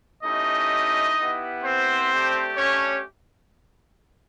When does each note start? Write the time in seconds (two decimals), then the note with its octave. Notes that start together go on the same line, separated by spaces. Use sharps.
0.23 A3 C#4 D#4 E4 G4 D#5
1.17 B3 E4 G4
1.63 C4 C5
2.11 A3 D4 G4
2.57 C#4 C#5